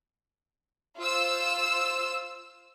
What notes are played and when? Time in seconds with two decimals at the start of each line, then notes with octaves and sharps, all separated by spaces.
0.99 F4 C5 E6